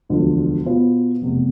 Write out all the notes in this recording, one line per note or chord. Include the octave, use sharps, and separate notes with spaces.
E1 D2 D3 F3
B2 B3 F4 C5
F1 E2 C3